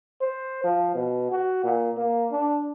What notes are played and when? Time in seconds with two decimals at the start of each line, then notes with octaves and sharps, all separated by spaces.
0.22 C5
0.64 F3
0.95 B2
1.32 F#4
1.64 A#2
1.97 A#3
2.32 D4